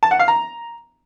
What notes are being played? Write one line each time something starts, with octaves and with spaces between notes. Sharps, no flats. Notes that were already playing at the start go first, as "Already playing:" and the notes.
A5
F#5
F5
A#5